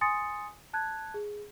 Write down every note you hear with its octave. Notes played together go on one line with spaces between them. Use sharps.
G#5 C6 D#6 A6 C#7
A5 F#6 G#6
G#4